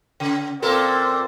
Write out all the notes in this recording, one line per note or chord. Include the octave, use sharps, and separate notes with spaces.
C#3
A#2 C4 A4 A#4